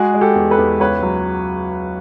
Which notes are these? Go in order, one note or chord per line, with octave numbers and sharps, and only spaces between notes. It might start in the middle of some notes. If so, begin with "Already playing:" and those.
Already playing: G#3 F#4 G#4
G#3
G4 A4
E2
A4 B4
E2
C#2 B4 C#5
F#3